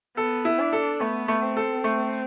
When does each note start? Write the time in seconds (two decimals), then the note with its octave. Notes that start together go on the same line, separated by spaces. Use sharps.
0.17 B3 A4
0.45 E4
0.59 D4
0.73 A4
1.01 A3 B3
1.28 A3
1.42 C4
1.57 A4
1.84 A3